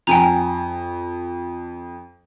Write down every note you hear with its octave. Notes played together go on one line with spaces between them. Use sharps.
F2 G5 G#5 A#5